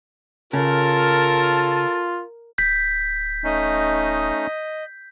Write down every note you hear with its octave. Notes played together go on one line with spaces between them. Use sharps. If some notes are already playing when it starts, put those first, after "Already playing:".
C#3 F4 A4 A#4 C#5 A5
D1 G6 B6
A3 C#4 D#4 D#5